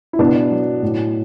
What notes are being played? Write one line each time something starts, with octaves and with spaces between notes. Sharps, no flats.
E4
B2 B3 D4
F#3
A2